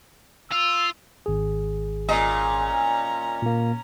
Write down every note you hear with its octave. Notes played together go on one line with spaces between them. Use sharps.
F4 E6
G#1 G#4
A#2 C#4 D#5 A#5
A#2 A#3